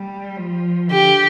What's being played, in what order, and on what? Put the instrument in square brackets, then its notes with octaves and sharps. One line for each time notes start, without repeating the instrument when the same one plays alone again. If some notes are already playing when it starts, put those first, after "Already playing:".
Already playing: [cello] G3
F3
[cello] D3 [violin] G4